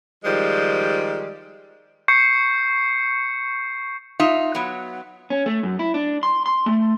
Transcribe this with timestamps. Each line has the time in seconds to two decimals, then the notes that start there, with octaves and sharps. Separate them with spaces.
0.25 D#3 F3 G3 G#3
2.08 C#6 G6 C7 C#7
4.20 D#4 F4 E5
4.55 F#3 B3
5.30 C#4
5.46 A3
5.63 F#2
5.79 E4
5.94 D4
6.23 C6
6.46 C6
6.66 A3